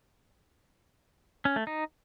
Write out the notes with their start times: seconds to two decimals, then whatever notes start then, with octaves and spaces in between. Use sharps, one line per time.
1.45 C#4
1.56 A3
1.67 D#4